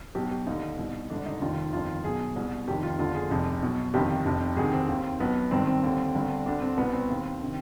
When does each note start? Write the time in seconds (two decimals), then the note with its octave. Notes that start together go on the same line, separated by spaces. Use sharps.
0.15 B1 B2 G4
0.31 G4
0.47 D#2 D3 D#4
0.78 C2 B2
1.10 G#1 G2 D3 D4
1.26 D#4
1.41 F1 D#2 D#3 F4
1.73 G1 F2 D#3 F4
2.04 B1 B2 G#4
2.35 C2 B2 G#4
2.68 F1 F2 D#3 G4
2.83 F4
2.99 G1 F2 D3 F4
3.15 G#4
3.30 F1 F2 C3
3.62 B1 B2
3.94 G1 F2 C3 D#3 G4
4.26 F1 F2 C3
4.57 D2 C3 D#3 G#4
4.73 C4
4.88 D#2 D#3
5.20 B1 B2 B3
5.51 G#1 G2 D#3 C4
5.67 C4
5.83 D#2 D3
6.15 G1 G2 D3
6.46 D2 D3 D4
6.62 C4
6.77 C2 B2 B3
6.93 C4
7.10 D#2 D#3
7.43 C3 D#3